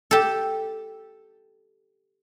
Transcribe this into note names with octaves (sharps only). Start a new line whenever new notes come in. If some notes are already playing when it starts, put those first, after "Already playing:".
G4 A4